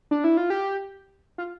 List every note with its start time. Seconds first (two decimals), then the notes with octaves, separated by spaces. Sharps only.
0.11 D4
0.24 E4
0.37 F4
0.50 G4
1.38 F4